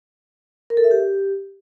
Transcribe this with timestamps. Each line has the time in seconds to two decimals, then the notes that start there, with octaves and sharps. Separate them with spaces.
0.70 A#4
0.77 A4
0.84 E5
0.91 G4